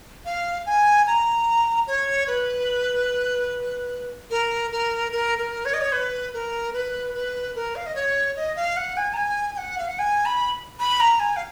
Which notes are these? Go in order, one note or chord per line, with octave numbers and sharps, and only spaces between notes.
F5
G#5
A#5
C#5
B4
A#4
A#4
A#4
A#4
C#5
D#5
C#5
B4
A#4
B4
B4
A#4
F5
D#5
C#5
D#5
F5
F#5
G#5
A#5
G#5
G#5
F#5
F5
F#5
G#5
B5
B5
A#5
G#5
F5